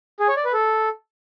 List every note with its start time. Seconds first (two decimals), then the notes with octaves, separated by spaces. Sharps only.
0.20 G#4
0.28 C#5
0.37 D5
0.45 B4
0.53 A4